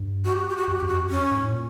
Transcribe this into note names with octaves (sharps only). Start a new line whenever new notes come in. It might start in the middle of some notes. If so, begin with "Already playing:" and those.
Already playing: G2
F#4
G4
F#4
G4
F#4
G4
F#2 F#4
F#2 G4
F2 F#4
F#2
F2 C#4
G#2
A2
A#2